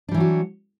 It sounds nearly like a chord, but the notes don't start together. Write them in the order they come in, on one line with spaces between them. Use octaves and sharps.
D4 G3 E3 F#3 F#4